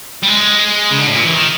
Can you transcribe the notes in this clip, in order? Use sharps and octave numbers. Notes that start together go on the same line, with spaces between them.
G3
G#3
C#3
D3
A2
A#2
E3
D#3